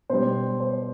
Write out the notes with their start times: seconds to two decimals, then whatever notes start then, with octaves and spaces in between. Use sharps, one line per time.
0.09 B2 G3 C5
0.60 C5